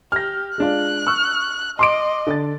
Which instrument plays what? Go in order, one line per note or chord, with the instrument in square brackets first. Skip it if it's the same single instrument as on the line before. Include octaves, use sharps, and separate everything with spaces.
[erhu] G4 [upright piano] F6 A#6
[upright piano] G#3 D4 F4 [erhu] F#6
[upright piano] C#6 E6 F6
[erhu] D#5 [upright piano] C6 D6 D7
[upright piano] D3 A6